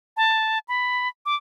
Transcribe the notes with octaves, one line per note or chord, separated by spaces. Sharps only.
A5
B5
D6